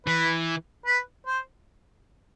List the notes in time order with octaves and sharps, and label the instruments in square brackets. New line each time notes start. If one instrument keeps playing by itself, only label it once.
[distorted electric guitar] E3 [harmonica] B4
[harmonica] B4
C5